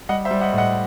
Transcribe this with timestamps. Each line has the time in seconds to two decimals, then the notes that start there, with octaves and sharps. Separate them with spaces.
0.09 G3 D#5 F#5
0.25 C5 E5
0.31 G3
0.41 D#5 F#5
0.53 A2
0.58 D#5 F#5